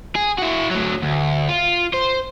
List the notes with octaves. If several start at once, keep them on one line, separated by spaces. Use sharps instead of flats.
G#4
E4 F#4
A2 F#3
D2
F4
C5